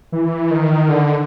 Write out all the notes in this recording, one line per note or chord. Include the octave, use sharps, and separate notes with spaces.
E3
D#3
D3